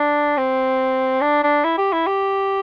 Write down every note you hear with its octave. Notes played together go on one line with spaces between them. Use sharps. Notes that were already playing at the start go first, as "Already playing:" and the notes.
Already playing: D4
C4
D4
D4
E4
G4
E4
G4